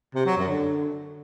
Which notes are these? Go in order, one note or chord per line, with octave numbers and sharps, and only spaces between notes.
C3
F#3
F#2
D3